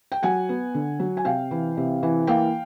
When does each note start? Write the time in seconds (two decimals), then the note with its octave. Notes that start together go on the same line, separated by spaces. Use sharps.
0.12 G5
0.23 F#3 F#5 G#5
0.49 B3
0.74 D3
1.00 F#3
1.17 G#5
1.25 C3 F5 G5
1.51 E3
1.77 C3
2.03 E3
2.27 A#3 F5 G5